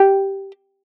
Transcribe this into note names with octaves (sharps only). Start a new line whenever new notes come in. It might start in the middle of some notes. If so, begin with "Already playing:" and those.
Already playing: G4